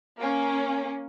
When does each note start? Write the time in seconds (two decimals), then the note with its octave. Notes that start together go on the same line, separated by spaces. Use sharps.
0.18 A#3 C#4